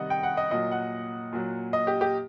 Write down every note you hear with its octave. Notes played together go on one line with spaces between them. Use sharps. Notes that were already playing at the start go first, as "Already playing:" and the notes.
Already playing: C3 D#3 G3 D#5 F#5
G5
F#5
D#5
A#2 F#3 D#5
F#5
A#2 F#3
D#5
G4
G4